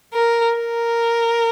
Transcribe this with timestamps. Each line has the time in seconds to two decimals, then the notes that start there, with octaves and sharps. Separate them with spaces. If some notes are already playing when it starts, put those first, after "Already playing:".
0.13 A#4
0.57 A#4